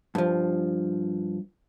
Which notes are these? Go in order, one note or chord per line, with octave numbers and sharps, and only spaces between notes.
G2 F3